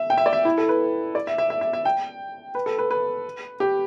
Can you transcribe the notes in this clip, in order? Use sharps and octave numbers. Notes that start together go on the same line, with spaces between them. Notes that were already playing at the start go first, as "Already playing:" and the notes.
Already playing: E5
G5
E5
D5
E5
E4
A4
B4
D5
E5
E5
E5
E5
E5
G5
B4
A4
B4
B4
G4